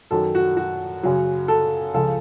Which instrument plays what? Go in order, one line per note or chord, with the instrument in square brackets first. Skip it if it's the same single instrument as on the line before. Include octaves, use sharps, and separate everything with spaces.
[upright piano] F#2 D#3 F#3 A4
F#4
F#4
F#2 C#3 F#3
A4
C#2 C#3 F3 A4